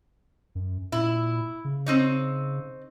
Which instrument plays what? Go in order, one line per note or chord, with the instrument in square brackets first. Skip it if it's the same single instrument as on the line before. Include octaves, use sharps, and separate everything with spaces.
[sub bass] F#2
[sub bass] A#2 [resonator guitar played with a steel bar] E4
[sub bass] C#3
[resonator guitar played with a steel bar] C4 D#4 C#5